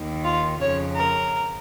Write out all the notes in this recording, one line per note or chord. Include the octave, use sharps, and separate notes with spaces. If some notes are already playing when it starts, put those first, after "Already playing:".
Already playing: D#2 D#3
F4
F2 C#3 C#5
A#4